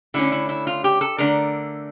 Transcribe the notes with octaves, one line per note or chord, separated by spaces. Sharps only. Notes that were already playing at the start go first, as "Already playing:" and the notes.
D3 A3 C#4 E4
E4
E4
F4
G4
A4
D3 A3 D4 A#4